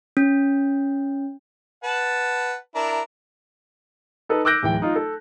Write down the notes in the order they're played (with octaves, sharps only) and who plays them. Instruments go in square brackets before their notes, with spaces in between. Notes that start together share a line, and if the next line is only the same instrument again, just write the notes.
[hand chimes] C#4
[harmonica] B4 F#5 A5
D4 E4 A#4
[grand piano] D#4 A4 B4
D6 E6 F#6 G6 A#6 D7
D1 E3 G5
D#4 F4
A4